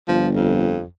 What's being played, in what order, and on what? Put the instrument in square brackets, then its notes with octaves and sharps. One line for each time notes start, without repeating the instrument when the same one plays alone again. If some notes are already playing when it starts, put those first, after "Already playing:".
[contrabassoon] G1 [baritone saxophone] F3
[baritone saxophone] F2